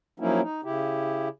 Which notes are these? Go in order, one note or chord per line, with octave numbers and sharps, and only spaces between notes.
F3 F#3 A#3 C#4 D#4 E4
D#4
C#3 E4 G4